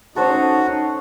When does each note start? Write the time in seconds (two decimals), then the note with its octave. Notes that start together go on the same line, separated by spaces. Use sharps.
0.16 C#4 D#4 F#4 A4 C5 C#5